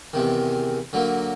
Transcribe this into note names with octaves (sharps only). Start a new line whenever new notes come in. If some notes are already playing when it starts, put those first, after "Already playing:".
E2 C3 D#3
D3 F#3 A#3